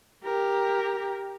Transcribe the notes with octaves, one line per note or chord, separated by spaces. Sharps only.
G4 A#4